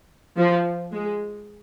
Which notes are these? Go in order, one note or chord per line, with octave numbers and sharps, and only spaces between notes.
F3
G#3